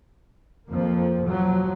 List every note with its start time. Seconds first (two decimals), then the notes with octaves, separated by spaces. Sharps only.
0.70 F2 F3 A#3
1.26 F3 F#3